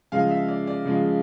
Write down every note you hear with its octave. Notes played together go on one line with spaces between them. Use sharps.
C#3 F3 G#3 F5
E5
D5
D5
C#3 F3 G#3